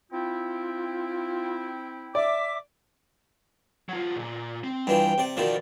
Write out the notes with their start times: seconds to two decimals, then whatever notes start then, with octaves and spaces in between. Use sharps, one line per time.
0.12 C4 E4 F4 G5
2.15 D5 E5 D6
3.89 F#3 F4
4.16 G2 A#2
4.64 C4
4.87 G2 E3 F3 G5
5.18 C3 D5
5.37 B1 B2 D#3 F3 D5